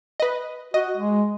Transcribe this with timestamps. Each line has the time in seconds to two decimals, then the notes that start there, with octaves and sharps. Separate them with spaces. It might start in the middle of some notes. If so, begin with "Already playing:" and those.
0.20 B4 D#5
0.74 F#4 D#5
0.97 G#3